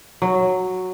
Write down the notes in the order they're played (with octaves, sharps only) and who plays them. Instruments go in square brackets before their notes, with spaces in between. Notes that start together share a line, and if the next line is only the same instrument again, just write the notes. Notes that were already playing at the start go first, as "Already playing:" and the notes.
[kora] F#3